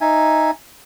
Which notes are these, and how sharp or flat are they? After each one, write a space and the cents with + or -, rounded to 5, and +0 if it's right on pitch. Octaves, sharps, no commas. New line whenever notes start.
D#4 +0 E5 +0 G#5 -5